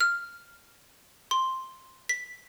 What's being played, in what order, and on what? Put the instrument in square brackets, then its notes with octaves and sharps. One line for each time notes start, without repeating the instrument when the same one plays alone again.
[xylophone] F6
C6
B6